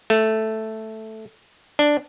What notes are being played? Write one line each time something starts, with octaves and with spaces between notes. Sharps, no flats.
A3
D4